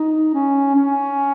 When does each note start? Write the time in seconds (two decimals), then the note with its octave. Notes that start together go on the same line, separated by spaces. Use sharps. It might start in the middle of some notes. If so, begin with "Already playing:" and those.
Already playing: D#4
0.34 C#4
0.75 C#4